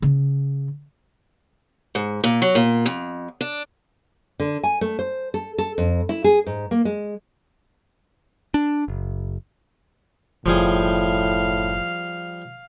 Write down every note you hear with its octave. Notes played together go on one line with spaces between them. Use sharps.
C#3
G#2
A#2
F#3
A#2
F2
D4
D3
G#5
A3
C5
A4
A4
F2
E4
G#4
G#2
A#3
G#3
D4
F#1
F#1 A2 F3 G3 G#4 F5